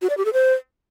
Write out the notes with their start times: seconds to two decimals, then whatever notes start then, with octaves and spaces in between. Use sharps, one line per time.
0.02 F#4
0.10 D5
0.17 G4
0.25 A4
0.33 C5